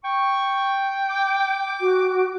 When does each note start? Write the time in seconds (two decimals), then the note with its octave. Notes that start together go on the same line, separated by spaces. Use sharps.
0.04 G5 C#6
1.10 D6
1.81 F#4